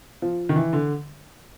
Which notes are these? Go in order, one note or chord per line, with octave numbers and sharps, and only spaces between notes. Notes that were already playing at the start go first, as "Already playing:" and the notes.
F3
D#3
E3
D3